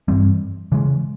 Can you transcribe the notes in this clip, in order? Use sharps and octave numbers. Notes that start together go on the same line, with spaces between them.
G2 E3 G3 C4
C#3 E3 G#3